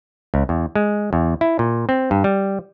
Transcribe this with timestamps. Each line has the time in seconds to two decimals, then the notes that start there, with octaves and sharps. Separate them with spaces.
0.34 C#2
0.49 E2
0.76 G#3
1.13 E2
1.41 E4
1.59 A#2
1.89 C4
2.11 G2
2.24 G3